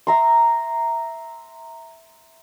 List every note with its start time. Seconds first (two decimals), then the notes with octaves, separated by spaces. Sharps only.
0.07 E5 A#5 C6